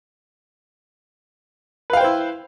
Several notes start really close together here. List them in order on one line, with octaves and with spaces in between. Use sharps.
B4 F5 G5 C5 E4